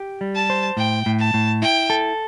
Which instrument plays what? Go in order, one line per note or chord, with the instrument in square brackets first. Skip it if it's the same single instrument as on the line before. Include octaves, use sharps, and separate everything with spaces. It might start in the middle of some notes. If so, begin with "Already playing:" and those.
Already playing: [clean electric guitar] G4
G3
[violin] A5
[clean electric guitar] C5
[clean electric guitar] A2 [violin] G5
[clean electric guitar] A2
[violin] A5
[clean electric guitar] A2
[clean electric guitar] E4 [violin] G5
[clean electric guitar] A4